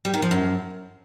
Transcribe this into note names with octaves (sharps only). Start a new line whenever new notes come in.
G3
D#3
F3
F#2